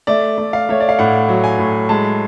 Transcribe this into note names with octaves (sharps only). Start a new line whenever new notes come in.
A3 D5
A3
F5
A3 C#5
D5
F5
A2 F#5
F#3
G#5
A2
G#3 A5